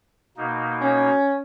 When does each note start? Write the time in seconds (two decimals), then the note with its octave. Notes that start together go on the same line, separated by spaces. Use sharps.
0.37 B2 A#3 D#4
0.81 C#4